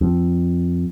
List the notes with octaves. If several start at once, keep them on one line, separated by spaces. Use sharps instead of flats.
F2